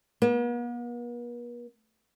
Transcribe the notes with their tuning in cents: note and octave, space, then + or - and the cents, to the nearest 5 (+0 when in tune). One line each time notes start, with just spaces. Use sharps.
B3 -45